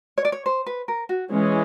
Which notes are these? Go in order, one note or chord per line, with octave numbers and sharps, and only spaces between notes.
C#5
D5
C#5
C5
B4
A#4
F#4
E3 G#3 C#4